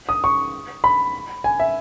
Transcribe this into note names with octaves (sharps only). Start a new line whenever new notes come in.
D#6
C#6
B5
G#5
E5